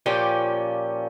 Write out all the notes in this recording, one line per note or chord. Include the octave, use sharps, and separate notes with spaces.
A#2 F3 C#4 G4